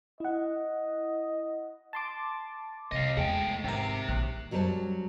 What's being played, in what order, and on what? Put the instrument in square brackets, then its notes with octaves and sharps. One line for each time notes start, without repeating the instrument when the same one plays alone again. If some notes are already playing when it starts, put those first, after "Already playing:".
[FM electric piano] E4 F#5 [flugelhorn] D#5
[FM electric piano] A5 C6 D6
[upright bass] C2 [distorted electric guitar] D#5 F5
[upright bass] E2 [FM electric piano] G#3 [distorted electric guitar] A3 G5
[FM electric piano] G#1 A#4 [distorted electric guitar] C3 [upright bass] D#4
[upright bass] A#1 [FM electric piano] D#2 F#6
[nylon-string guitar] F#2 F#3 G3 G#4 C5 A5